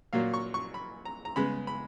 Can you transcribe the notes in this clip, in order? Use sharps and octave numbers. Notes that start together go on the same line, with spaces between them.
A#2 F#3 A#3 F5
C#6
C#6
B5
A#5
A#5
C#3 G#3 B3 B5
B5